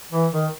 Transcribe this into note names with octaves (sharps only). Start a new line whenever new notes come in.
E3
D#3